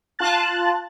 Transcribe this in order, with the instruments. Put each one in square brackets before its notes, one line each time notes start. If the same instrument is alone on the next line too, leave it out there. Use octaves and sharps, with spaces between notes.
[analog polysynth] F4 A5 F#6 A6